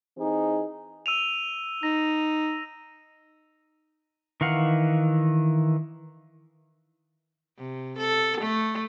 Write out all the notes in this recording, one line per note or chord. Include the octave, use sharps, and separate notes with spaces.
E3 C4 D#4 G#4
E6 D#7 F7
D#4 A#6
D#3 E3 F5 F#5
C3
A4
A3